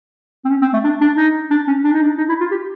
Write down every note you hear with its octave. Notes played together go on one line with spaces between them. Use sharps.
C4
C#4
C4
A3
D4
D4
D#4
D4
C#4
D4
D#4
D4
D#4
E4
F4
G4